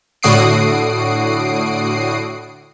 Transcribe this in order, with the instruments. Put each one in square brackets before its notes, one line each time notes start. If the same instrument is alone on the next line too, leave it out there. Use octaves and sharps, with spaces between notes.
[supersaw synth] A2 D3 F#4 D#6 C7 D7